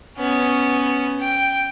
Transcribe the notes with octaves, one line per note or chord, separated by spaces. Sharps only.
B3 C#4
G5